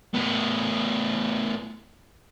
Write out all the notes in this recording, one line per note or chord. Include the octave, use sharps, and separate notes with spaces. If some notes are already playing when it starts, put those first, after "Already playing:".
A2 B3